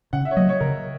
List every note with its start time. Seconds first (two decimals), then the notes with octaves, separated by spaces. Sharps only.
0.13 C#3 F#5
0.25 E5
0.31 C#5
0.37 F#3 A#3 D#5
0.49 C#5
0.60 C#3 A#4